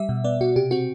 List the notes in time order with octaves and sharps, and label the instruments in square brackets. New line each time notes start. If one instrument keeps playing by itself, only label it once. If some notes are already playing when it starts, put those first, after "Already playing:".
Already playing: [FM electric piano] G3 E5
B2
B3 D5
B2 F#4
C3 G4
C4 F#4